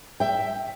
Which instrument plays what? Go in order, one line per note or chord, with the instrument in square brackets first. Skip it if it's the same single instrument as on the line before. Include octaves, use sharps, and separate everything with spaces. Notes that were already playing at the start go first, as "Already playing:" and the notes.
[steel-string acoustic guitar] E5 G5